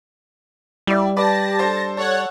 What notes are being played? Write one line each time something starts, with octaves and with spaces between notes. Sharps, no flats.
G3 E4 D5
G4 B4 D5 A5 A#6
D4 A4 C5
A4 C#5 D5 F#5